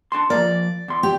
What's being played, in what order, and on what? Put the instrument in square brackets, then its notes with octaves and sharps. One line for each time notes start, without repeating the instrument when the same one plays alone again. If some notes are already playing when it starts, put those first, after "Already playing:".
[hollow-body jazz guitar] D4 A5 C6
[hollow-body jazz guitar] F3 A#3 A#4 [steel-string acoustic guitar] D5
[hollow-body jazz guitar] E2 C6
[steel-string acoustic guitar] G4